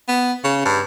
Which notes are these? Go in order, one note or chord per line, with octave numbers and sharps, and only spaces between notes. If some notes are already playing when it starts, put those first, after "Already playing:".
B3
C#3
G2